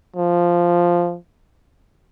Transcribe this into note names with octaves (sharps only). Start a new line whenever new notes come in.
F3